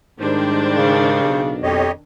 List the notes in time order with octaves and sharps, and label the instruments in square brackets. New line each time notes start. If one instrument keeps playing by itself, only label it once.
[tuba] G#2 [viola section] D#3 D4 [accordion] G3 C5
[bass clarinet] C#3
[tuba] B1
[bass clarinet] F2 [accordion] G4 C#5 D#5